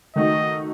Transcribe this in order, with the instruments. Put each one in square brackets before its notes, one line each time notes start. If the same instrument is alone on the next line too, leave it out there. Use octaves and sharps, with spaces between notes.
[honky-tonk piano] D#3 A3 D#4 F#4 [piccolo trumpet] D#5